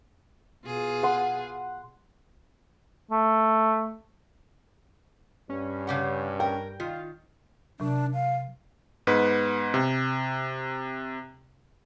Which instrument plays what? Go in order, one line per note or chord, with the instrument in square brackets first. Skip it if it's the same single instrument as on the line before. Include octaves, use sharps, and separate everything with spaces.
[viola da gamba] B2 F4 G#4
[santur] F#5 C6
[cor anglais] A3
[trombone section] G2 [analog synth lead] C#4
[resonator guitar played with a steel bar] C#3 G4 F#5
[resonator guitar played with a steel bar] A#4 [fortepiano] G5
[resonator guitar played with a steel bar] D#3 [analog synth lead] F4
[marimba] C3 F#3 [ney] D4
[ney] F5
[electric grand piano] G#2 B3 B4
C3